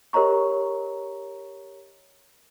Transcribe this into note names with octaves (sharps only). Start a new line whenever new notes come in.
G4 A#4 C#5 D#5 A#5 C#6